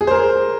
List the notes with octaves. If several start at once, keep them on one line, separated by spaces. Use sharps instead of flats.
G#4
C5
A#4